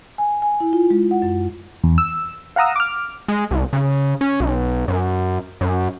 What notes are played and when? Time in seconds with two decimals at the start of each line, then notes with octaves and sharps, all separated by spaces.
0.18 G#5
0.42 G#5
0.60 E4
0.73 F4
0.90 G#3
1.11 F#5
1.22 F#2
1.84 E2
1.98 E6
2.56 F5 F#5 A#5 D#6 E6
2.76 D6 F6
3.28 G#3
3.51 C2
3.73 C#3
4.21 C#4
4.40 B1
4.88 F#2
5.61 F#2